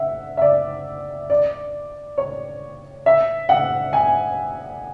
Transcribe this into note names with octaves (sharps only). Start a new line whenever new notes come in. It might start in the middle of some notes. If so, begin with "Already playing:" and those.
Already playing: E5 F#5
E5
D5
D5
C#5
E5
F#5
G#5